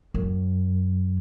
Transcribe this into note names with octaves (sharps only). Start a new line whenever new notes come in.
F#2